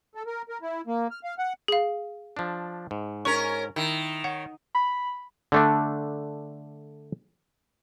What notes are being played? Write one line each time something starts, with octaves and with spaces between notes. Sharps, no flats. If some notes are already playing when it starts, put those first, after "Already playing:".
A4
A#4
A#4
E4
A#3
F6
F5
F#5
G#4 F5
F3 D4
G#2
C#4 A#4 C#6
D#3 E4
C#5 F#5
B5
D3 A3 D4